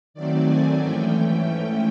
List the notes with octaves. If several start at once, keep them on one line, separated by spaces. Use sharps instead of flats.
D#3 F#3 A3 C4 D5
G#5
G#2 E3 A3 C#4 G5